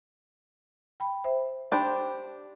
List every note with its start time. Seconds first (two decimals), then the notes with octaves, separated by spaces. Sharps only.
1.00 G5 B5
1.24 C5 E5
1.72 D4 G4 C5 G5 B5